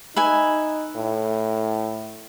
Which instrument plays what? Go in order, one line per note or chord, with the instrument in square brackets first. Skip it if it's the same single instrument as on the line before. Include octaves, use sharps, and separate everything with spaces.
[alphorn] D#4 [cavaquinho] B4 E5 G#5
[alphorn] A2